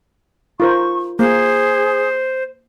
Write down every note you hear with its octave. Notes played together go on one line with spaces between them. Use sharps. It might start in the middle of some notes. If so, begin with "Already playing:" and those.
F4 A#4 C5 C#6
A#3 G#4 C5